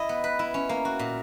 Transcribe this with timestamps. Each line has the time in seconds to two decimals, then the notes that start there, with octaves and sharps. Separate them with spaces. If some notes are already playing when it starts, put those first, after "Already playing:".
Already playing: E4 D#5
0.09 B3
0.24 B4
0.39 E4
0.54 C#4
0.69 A#3
0.85 F#4
0.99 A#2